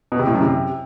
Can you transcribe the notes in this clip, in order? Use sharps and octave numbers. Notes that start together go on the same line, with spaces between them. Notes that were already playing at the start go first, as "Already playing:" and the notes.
B2
C3
A2
F#2
C3